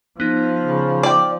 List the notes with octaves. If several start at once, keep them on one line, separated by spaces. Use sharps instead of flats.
F3 B3 D#4
C#3
D5 G5